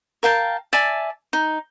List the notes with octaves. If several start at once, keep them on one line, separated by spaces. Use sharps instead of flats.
A#4 F5 G5 A5
D5 E5 G#5 A5
D#4